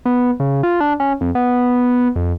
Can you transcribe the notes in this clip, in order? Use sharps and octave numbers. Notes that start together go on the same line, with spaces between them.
B3
C#3
F4
D4
C#4
F2
B3
F2